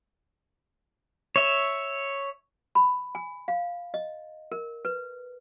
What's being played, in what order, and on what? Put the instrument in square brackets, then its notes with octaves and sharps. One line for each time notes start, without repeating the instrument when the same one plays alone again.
[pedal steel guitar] C#5 E5
[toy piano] B5
G#5
F5
D#5
A#4
B4